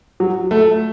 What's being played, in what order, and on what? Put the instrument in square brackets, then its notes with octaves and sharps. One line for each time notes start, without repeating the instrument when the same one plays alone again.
[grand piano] F#3
A3